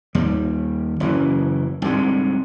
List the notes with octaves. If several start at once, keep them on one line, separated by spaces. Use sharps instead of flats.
D#2 G3
F#1 F#2 E3
C2 G#2 D3